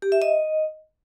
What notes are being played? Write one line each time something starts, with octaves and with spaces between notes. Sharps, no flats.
G4
E5
D#5